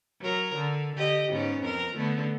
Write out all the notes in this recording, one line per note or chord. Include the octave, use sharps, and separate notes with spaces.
F#3 A#4
D3
D3 G4 D#5
G#2 B3 C#4
F2 A#4
D3 A3 B3